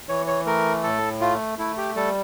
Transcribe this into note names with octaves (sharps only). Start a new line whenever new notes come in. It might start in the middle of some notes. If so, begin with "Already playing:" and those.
E3 C#5
C#5
A3 A#4
A2 A4
A3 F4
A3 E4
G4
G3 A4